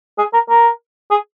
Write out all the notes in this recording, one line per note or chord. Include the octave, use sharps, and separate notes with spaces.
G#4
A#4
A#4
G#4